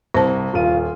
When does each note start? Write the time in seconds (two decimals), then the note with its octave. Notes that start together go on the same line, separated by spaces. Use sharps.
0.14 C2 C5 A5
0.54 D#1 F4 D#7